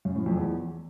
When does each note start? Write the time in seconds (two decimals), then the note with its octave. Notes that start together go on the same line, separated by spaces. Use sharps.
0.05 F#2
0.16 A2
0.26 F2
0.37 E2